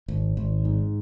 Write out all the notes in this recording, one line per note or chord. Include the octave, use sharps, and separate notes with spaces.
G#1
G#1
G#2